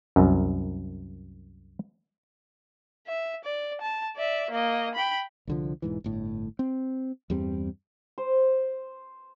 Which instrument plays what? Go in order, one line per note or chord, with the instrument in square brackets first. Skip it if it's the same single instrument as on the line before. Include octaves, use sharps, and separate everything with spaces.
[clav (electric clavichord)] C2 F#2
[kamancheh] E5
D5
A5
D5 E5
A#3 D#5
G5 B5
[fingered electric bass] C2 D3 F3
E1 G#2 E3
G1 A2
C4
E2 G2 G3 C4
[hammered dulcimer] C5